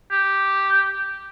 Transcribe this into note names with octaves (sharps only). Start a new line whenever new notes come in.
G4